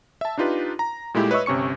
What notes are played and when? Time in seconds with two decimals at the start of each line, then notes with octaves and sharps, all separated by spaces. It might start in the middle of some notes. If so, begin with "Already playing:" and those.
0.21 E5 A5
0.38 D4 D#4 F4 G4 B4
0.79 A#5
1.14 A#2 G#3 A3 E4 G4
1.31 B4 C#5 D#5 E5 C#6 E6
1.46 G1 C3 C#4 C#6 C#7